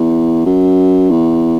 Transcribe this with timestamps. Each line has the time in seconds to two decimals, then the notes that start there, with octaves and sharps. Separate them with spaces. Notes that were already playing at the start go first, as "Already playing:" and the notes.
Already playing: E2
0.46 F#2
1.10 E2